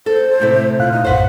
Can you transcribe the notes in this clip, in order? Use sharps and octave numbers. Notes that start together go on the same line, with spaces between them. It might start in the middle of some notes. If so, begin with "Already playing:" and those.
A4 C5
A2 C3 E4
A#2 F4 F5 F#6
D#4
A#1 F#2 A2 B4 C5 F#5